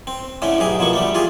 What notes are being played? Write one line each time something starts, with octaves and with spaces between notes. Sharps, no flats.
C4
A2 D3 A3 C#4
B1 G#2 G4 G#4
B2 F3 A#3 C#6
D3 G3 A3
F4 G4 G#4